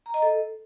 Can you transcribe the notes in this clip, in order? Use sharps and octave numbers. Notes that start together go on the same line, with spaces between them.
A#5
D#5
A4